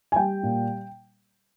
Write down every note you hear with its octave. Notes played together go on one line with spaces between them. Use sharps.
G#5
G3 G5
A#2